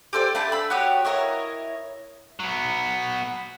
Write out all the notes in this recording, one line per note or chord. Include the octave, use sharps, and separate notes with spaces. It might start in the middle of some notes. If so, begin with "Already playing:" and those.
G4 A4 C5 D5
A3 D4 A5 B5
B5 E6
F#4 G4 C#5 D#6
E4 A#4 C#5 D#5
F#3 B3